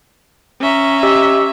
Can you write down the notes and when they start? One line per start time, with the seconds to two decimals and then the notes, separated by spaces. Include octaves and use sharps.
0.60 C#4 E5 A#5
1.03 G4 D#5 E6